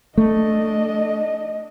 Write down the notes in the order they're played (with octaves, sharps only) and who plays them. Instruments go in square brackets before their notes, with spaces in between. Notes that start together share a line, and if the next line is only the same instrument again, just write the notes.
[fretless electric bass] A3 [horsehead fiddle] D4 D#5